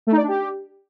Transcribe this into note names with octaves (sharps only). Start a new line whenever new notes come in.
A3
D#4
D5
D4
G4